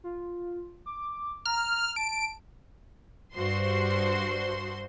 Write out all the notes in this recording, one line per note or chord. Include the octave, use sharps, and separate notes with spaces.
F4
D6
A#5 F6
A5 D7
G2 F#4 C5 C6